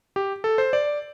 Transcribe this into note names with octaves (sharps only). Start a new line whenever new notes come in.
G4
A4
C5
D5